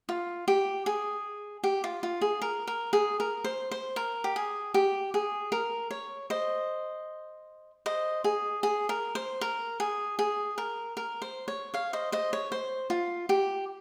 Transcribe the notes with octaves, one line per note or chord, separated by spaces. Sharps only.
F4
G4
G#4
G4
F4
F4
G#4
A#4
A#4
G#4
A#4
C5
C5
A#4
G4
G#4
G4
G#4
A#4
C#5
C5 D#5
C5 D#5
G#4
G#4
A#4
C5
A#4
G#4
G#4
A#4
A#4
C5
C#5
C#5 F5
C5 D#5
C5 D#5
C#5
C5
F4
G4